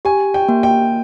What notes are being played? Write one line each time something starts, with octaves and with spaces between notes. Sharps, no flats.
G4 G#5
G5
A#3
G5